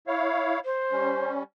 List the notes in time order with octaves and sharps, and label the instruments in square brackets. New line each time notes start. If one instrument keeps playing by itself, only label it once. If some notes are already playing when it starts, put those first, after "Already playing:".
[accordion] E4 C#5 F5
[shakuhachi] C5
[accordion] G3 C#4